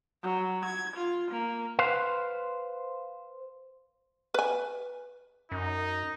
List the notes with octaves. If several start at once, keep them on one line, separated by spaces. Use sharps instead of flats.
F#3
G#6
F4
A#3
B4 C5 F5
B4 G#5
F#2 D#4